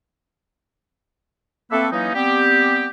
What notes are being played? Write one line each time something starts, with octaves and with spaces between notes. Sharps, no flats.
A3 A#3 C4 A4 B4 E5
E3 F#3 A#3 C#4 D#4
G3 B3 C4 G4